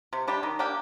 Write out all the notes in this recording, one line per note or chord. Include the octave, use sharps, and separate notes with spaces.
C3
G3 D4 G4
D#3
A#3 D4 G4